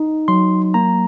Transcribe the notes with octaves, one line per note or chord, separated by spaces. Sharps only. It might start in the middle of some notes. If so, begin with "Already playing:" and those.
Already playing: D#4
F#3 C6
A#3 A#5